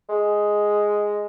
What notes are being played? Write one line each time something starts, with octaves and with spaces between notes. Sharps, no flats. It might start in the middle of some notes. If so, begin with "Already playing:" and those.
G#3